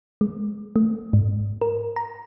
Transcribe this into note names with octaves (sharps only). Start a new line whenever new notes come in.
G#3
A3
G#2
A#4
A#5